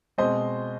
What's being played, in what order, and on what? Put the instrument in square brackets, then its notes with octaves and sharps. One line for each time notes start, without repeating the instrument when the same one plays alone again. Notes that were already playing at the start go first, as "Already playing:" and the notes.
[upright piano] B2 G#3 C4 C5 D#5